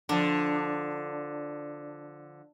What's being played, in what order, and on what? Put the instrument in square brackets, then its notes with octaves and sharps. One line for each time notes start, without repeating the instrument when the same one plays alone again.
[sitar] D3 F3 [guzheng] D4